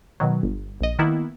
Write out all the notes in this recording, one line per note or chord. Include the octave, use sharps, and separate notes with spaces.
B2 D#3 F#3
G1
A#1 D#5
D#3 A#3 B3 E4